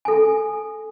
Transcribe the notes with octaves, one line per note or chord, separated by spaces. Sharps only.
A4 G#5